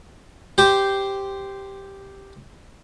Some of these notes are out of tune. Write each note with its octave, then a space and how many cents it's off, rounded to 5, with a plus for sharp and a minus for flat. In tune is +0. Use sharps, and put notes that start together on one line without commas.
G4 +0 C5 -5